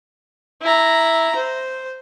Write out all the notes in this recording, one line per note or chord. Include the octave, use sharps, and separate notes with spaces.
E4 A#5
C5